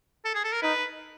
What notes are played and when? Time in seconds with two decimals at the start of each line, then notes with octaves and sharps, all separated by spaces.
0.25 A4
0.35 G#4
0.44 A4
0.52 A#4
0.62 D#4 B4